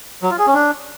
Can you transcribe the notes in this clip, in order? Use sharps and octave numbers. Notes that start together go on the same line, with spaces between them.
F#3
F4
G#4
C#4
D4